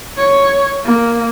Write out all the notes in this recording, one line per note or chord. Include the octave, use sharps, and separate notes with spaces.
C#5
A#3